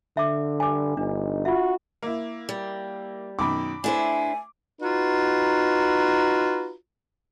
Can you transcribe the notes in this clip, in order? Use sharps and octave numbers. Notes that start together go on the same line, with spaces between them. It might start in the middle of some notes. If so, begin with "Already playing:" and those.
D3 E5 D6
G2 G#5 D6
G1 D4 D#4
F4 F#4 E5
A#3 E4
G3
F#2 B2 D#3 B5 D6
A3 D4 E4 C5 G#5
D#4 F4 F#4 B4 A#5